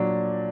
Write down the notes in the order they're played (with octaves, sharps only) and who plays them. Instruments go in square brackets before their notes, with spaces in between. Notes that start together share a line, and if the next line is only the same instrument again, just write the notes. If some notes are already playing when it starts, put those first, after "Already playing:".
Already playing: [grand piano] A#2 F#3 D4